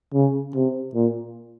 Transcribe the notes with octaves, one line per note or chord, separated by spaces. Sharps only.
C#3
C3
A#2